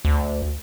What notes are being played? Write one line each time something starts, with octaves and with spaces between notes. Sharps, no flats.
D2